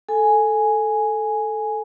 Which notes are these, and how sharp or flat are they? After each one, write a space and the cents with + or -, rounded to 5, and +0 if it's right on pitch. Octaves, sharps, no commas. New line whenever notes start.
A4 +0 G#5 +0